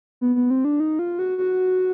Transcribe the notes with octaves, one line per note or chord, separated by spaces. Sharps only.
B3
B3
C4
D4
D#4
F4
F#4
F#4